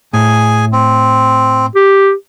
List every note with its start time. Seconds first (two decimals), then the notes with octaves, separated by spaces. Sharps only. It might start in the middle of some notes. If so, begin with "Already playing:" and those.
0.13 A2 G#4 G#5
0.72 C4
1.75 G4